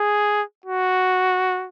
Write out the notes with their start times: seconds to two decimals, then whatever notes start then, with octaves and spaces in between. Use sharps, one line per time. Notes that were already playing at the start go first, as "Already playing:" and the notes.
Already playing: G#4
0.65 F#4